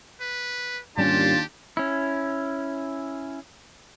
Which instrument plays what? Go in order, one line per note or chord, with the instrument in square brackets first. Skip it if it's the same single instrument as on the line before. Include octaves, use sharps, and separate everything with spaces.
[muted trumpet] B4
[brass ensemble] D#2 D4 F4 [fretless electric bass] G#2 G3 C#4 [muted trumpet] G4 [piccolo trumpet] A5
[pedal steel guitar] C#4 E4